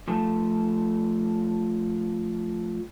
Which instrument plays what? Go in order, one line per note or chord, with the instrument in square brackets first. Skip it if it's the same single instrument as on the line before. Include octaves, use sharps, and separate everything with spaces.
[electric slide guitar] F3 A3 A4